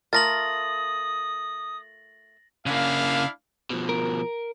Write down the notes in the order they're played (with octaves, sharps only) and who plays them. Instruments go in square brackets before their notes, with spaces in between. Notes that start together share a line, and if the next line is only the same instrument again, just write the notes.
[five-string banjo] A3 F4 A#4 [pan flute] D#6 [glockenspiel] A6 A#6 F#7
[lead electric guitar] C#3 A#3 [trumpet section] D4 E4 F5
[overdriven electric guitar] B2 F3
[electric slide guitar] A#4